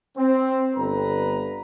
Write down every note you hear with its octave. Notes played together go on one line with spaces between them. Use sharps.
C4
G1 D3 B4 A#5